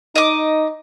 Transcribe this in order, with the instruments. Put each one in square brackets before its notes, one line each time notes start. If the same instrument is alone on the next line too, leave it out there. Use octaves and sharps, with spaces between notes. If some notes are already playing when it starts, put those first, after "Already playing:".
[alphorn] D#4 [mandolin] D#5 D6